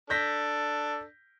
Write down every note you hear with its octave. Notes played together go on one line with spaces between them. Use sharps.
D4 A4 G6 A#6 B6